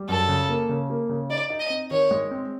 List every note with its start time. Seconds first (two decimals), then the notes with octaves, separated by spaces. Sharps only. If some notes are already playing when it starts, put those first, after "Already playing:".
Already playing: G3
0.09 F#2 A4
0.29 C#3
0.49 A#3
0.69 C#3
0.90 A#3
1.09 C#3
1.30 D#4 D5
1.50 D#4
1.60 D#5
1.70 C4
1.91 D#3 C#5
2.11 G#3
2.31 C4